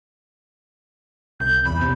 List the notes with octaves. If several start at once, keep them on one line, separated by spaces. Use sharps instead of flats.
C2 G6
E2 B5
C3